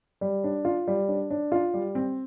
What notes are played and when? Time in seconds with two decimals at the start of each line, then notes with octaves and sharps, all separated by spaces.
0.21 G3
0.44 D4
0.65 F4
0.88 G3
1.08 D4
1.31 D4
1.52 F4
1.74 G3
1.95 C4